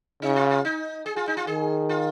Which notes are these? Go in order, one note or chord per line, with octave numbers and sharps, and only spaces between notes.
C#3 D#4
F4
F4
D#4
G#4
F4
D#4
F4
D#3 G#4
F4